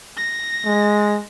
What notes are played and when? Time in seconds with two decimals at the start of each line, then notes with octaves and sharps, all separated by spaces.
0.17 A#6
0.65 G#3